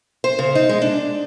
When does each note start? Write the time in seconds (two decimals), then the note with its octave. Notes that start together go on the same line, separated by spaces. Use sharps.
0.24 C5
0.39 C#3
0.55 D#4
0.69 G#3
0.82 D4